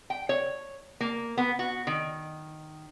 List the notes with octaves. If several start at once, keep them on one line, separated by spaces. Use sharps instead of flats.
G5
C#5
A#3
B3
F#4
D#3